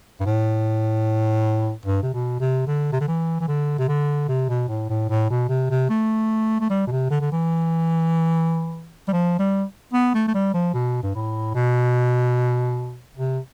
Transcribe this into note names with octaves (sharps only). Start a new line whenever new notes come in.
G2
A2
G2
C3
B2
C3
D3
C3
D3
E3
E3
D3
C3
D3
C3
B2
A2
A2
A2
B2
C3
C3
A3
A3
G3
B2
C3
D3
D3
E3
G3
F3
G3
B3
A3
A3
G3
F3
B2
G2
A2
B2
C3